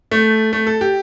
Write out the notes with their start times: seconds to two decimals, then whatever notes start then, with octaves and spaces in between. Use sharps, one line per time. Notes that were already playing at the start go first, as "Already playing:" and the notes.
0.11 A3
0.53 A3
0.67 A4
0.81 G4